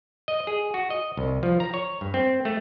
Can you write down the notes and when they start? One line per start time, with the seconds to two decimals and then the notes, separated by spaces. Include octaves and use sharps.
0.28 D#5
0.47 G#4
0.74 F#4
0.90 D#5
1.17 C2
1.43 F3
1.60 A#5
1.74 C#5
2.01 G2
2.14 C4
2.45 A3